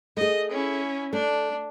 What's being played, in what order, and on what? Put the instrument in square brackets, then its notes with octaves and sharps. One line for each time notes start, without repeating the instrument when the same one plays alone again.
[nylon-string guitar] A3 G#4 [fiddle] D#5
[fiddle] C#4 E4
[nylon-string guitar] A3 [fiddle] D4